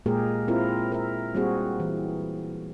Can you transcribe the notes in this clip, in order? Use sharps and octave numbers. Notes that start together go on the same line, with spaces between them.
A#2 G#3 A#3 G4 G#4 A#4
C4 E4 F4 A#4
A#4 E5
G3 A#3 C4 F#4 G#4
E3